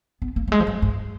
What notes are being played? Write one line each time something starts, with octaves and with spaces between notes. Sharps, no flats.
B3
A#3
F#3
G#3
F3
F#3
G#2